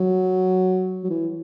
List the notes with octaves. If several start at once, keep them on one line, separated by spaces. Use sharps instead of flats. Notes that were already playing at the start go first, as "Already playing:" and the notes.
Already playing: F#3
F#3
E3